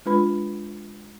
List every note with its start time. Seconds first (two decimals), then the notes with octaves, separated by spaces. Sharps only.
0.05 G#3 D4 F4 B4 B5